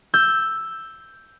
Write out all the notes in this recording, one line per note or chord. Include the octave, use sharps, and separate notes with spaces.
E6 G6